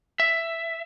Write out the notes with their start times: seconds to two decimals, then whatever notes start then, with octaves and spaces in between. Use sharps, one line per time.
0.20 E5